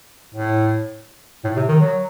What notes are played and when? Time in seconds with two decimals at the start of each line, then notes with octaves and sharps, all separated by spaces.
0.34 A2
1.44 A2
1.56 C3
1.69 D#3
1.81 F#3